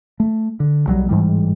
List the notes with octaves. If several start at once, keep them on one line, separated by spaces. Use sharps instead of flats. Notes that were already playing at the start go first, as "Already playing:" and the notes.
A3
D3
B1 F#3 G3
A1 G#2 E3 G3